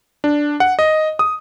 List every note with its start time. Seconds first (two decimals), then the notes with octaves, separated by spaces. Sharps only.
0.24 D4
0.60 F#5
0.79 D#5
1.19 D#6